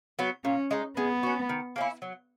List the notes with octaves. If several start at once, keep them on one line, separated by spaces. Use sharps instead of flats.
F#3 B3 F#4
A#2 C#4
G#3 D#4
G#3 B3
C#4 F#4
D#3
A#3 C#4 E4
F#3